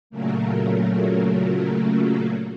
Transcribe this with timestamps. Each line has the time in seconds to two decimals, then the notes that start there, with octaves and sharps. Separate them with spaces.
0.10 A#2 C#3 F#3 A3 A#3